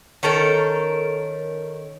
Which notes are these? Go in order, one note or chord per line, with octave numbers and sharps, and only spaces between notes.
D#3 C#4 A4 A#4